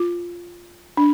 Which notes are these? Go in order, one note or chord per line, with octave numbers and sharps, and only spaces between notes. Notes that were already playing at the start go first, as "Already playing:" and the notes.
Already playing: F4
D4